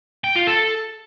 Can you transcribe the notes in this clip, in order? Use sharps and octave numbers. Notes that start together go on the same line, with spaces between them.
G5
F4
A4